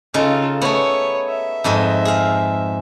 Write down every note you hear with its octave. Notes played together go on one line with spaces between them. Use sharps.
C#3 D#4 F4 A4
A3 B3 C#5
E5
F2 G#2 D#5
G#4 F5